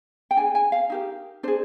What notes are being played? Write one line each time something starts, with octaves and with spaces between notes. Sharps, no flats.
G5
D4 G#4 G#5
G#5
F5
D#4 G4 A#4
D4 G#4 C5